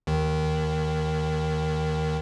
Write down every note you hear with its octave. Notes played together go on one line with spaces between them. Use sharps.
D#2 D#3